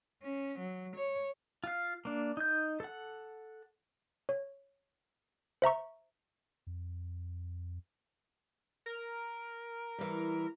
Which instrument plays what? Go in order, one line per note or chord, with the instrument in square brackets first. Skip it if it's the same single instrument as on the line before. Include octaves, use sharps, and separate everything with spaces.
[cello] C#4
F#3
C#5
[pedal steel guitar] F4 F5
A#3 D4
D#4 G6
A4 F#5
[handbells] C#5
C5 E5 A#5 C#6
[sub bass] F2
[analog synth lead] A#4
[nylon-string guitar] E3 G3